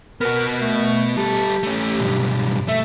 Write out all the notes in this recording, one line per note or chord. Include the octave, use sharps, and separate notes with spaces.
B3 F#4 A#4
A3
G3 G4 A4
A3 C#4
B1 G2
A3 E5